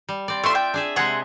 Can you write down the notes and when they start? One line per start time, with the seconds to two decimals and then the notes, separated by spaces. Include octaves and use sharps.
0.09 G3
0.28 C4 D5
0.44 A3 F4 D5 E5 C6
0.55 G5
0.74 D4 G#4 E5
0.96 C3 G#3 C4 G#4 F#5